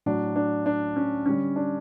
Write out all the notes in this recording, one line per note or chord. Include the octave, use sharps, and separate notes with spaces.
A2 F#3 D4
D4
D4
C#4
D3 G3 C#4
D4